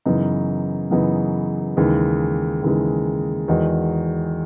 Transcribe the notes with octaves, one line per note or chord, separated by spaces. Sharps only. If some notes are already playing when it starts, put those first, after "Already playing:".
F#2 C#3 E3 B3 D#4
F#2 C#3 E3 B3 D#4
D#2 C#3 E3 G#3
D#2 C#3 E3 G#3
E2 D#3 G#3 D#4 F#4